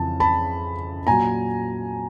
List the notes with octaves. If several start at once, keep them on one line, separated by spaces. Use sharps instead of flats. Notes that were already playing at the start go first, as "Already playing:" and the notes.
Already playing: F2 C#3 E3 A5
A5 B5
A#2 F#3 G#5 A#5